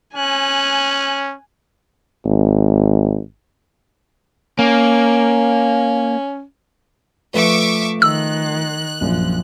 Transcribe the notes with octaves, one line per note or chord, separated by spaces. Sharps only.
C#4 G#5 F#6
G#1
A#3 C#4
F3 A3 B4 E5 C#6 D6
D#3 E6 F#6
A#1 F#2 F3